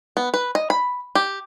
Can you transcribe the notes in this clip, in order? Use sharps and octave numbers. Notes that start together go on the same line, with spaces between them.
B3
B4
D#5
B5
G4